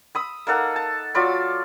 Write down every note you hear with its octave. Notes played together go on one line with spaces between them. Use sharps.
B5 D#6 E6
A#3 D#4 A4 F#5
A5
F#3 F4 D5 B5